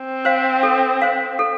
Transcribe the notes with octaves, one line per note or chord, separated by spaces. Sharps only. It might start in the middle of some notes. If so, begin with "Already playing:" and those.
Already playing: C4
C5 F5
A4
C5 F5
A4